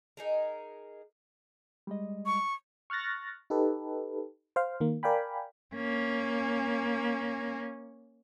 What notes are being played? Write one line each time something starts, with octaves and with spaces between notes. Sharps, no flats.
D#4 G#4 A#4
G3 G#3 D#5
C#6
C#6 F6 F#6 A6 A#6
D#4 G4 A4 B4
C5 F5
D#3 A#3
A#4 D5 F5 G5 G#5 B5
A#3 C#4